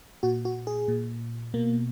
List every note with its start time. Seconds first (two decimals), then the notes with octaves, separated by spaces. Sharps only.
0.23 A#2 F#4
0.45 F#4
0.67 G#4
0.88 A#2
1.54 B2 A#3